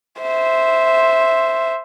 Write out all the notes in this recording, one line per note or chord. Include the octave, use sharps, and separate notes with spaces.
C5 E5